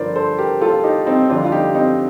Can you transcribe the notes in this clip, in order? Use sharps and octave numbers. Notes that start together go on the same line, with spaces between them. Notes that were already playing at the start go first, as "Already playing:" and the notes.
Already playing: G2 D3 F3 A#4 C5 D5
A4 C5
G4 A#4
F4 A4
D#4 G4
C4 D#4
F2 D3 G3 D4 F4
F4
D#4 G4
C4 D#4